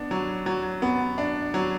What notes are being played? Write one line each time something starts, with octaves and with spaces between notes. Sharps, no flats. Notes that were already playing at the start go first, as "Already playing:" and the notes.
Already playing: B3 D4
F#3
F#3
B3
D4
F#3